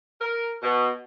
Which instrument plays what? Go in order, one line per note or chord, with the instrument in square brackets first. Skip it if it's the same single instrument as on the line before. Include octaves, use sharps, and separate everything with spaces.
[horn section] A#4
B2